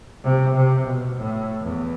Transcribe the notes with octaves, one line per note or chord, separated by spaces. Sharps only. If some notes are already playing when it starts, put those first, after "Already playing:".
C3
C3
B2
A2
E2